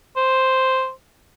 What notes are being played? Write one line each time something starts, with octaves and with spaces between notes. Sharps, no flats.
C5